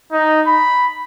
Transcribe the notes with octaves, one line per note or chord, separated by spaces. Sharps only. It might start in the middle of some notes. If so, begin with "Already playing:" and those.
D#4
B5